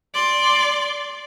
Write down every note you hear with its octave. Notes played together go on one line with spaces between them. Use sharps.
D5 C6